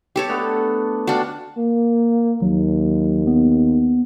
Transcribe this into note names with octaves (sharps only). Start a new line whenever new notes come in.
G4 A4 C#5
A3 B3 D4
D4 F#4 F5 G5
A#3
D#2 F#3
B3